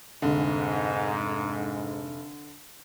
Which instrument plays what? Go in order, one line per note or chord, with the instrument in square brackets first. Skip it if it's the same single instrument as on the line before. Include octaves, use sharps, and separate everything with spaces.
[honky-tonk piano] F1 [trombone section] G#2 [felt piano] D3